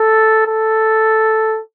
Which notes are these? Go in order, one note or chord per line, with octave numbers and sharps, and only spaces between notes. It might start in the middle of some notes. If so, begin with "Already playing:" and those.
Already playing: A4
A4